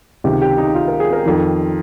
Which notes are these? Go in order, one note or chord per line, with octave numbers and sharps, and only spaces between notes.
C#2 C3 D#3 G4
G4
D#4
F4
A#4
G#4
A#4
F2 D#3